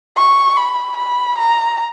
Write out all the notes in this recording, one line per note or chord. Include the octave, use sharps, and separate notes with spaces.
C#6
B5
B5
A#5